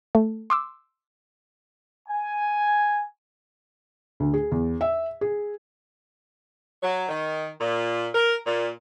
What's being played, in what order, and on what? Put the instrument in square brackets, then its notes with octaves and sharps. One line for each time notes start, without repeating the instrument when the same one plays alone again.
[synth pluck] A3
C6 D6 E6
[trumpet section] G#5
[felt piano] D2
G#4
E2
E5
G#4
[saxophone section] F#3
D#3
A#2
A#4
A#2